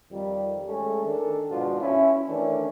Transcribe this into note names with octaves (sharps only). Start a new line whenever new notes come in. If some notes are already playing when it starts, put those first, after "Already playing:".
F2 D#3 G3
G#3 A3 C#4 A4
D#3 D4 A4
G#2 B2 F3 D4 F4 F#4
C#4 E4
D#3 E3 A3 C#4 D4